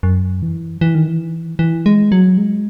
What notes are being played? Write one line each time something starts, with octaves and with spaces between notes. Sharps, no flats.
F#2
E3
E3
D#3
E3
E3
G#3
F#3
G#3